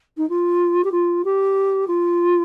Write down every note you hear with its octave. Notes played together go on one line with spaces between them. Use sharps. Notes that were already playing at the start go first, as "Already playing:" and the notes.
D#4
F4
G4
F4
G4
F4